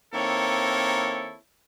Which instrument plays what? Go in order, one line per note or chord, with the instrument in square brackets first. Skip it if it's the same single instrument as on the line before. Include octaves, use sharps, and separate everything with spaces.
[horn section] D#3 A#3 C4 E4 A4 C#5